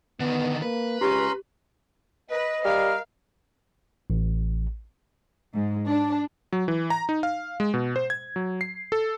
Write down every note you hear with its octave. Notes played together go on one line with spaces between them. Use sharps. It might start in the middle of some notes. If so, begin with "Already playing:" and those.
D3 D#3 B3
A#3 B4
C#2 C#4 G4 A#5 C6
B4 D#5
G3 A#4 F5
A1
G#2
D4
F#3
E3
A#5
D#4
F5
G#3
B2
C5
G#6
F#3
C7
A4